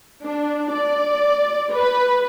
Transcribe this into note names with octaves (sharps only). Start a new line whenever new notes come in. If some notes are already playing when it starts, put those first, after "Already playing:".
D4
D5
B4